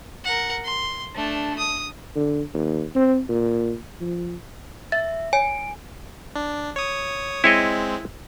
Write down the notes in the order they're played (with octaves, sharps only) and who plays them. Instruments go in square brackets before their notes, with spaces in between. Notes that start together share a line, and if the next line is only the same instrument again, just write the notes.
[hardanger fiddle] A#4 F#5
C6
A3 D4
D#6
[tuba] D3
D#2
C4
A#2
F3
[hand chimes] E5 [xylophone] A6
[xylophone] C#5 [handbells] G#5 [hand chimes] D7
[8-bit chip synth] D4
C#5 D#6
[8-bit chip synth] G#3 C4 [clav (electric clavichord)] E4 C#5 D#5